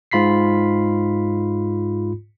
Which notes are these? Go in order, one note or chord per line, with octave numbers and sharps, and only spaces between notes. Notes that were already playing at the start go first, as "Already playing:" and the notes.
G#2 F4 B5 B6 C7